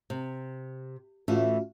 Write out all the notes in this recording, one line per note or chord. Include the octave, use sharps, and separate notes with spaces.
C3
A2 E3 A3 C#4 F4 F#4